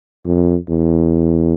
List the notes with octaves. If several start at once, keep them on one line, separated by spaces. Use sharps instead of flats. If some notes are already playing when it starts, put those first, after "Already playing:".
F2
E2